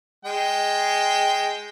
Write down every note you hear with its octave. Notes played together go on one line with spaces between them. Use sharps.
G#3 G5